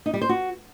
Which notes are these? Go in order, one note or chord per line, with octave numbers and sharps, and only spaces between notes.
D#4
G3
C5
F#4